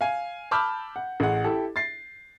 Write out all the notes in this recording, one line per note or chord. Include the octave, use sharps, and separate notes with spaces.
F5 G#5
A5 B5 D6 E6 F6 G6
F#5
A1 G#4 F#5
E4 G4 A4
A6 C7